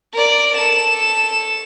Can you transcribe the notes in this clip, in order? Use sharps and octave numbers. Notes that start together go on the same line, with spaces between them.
A#4 D5
A4 E7